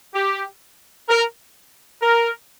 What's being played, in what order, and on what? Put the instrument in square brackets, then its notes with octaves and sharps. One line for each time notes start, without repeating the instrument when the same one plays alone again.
[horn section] G4
A#4
A#4